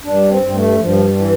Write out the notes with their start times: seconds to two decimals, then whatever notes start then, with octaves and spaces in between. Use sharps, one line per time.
0.03 G2 D4
0.28 C4
0.41 G2
0.54 A3
0.78 G2 F3
1.16 E3